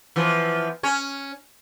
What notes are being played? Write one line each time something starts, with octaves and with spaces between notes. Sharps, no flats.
E3 F3 B3
C#4 C#5